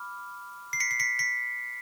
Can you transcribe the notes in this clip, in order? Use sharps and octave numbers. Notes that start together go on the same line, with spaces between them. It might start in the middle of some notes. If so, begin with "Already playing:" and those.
Already playing: B5 D6 F6
C7
B6 C#7
C7
B6 C#7
B6 C#7